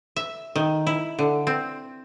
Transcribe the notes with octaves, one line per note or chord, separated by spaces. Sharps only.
E5
D#3
E4
D3
C4